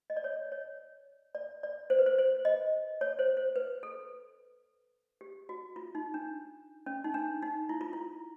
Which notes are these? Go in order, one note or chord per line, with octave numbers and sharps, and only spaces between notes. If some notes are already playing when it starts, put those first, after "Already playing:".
D#5
D5
C#5
C#5
D5
D5
C5
B4
C5
C5
D#5
C#5
C5
C5
B4
A4
G4
F#4
F4
D#4
D4
C#4
D#4
D4
D#4
E4
F4
E4